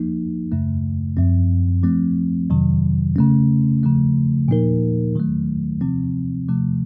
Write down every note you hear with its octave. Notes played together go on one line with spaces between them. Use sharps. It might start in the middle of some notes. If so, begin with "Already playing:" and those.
Already playing: F3 A#3 D#4
F#2 C#3 A3
F#2 F3 C4
F3 A3 C4
F2 C3 D#3 F#3
C#3 A3 C#4
C#3 F3 A3
A#2 F3 A#3 D#4 A#4
D#3 F#3 A3
C3 F3 C4
C3 F3 A3